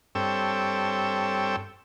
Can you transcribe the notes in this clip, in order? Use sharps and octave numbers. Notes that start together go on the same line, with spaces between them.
G2 C4 A4 C#5 G5 E6